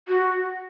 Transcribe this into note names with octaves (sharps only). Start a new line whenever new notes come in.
F#4